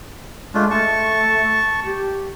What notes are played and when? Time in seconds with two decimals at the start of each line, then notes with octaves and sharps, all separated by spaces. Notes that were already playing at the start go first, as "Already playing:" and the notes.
0.54 G#3 A3 D4 F4
0.71 A3 A5 C#6
1.84 G4